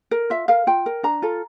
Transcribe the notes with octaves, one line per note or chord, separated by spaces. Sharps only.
A#4
F4 E5
A#4 F5
F4 G5
A#4
D4 A#5
F4 A4